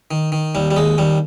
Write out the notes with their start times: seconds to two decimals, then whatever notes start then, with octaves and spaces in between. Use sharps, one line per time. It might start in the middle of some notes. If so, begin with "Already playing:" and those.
0.11 D#3
0.32 D#3
0.55 D#2 G3
0.71 G3
0.76 D#2 G#3
0.98 D#2 G3